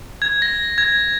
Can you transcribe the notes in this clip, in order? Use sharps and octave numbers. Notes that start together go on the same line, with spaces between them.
G#6
A#6
G#6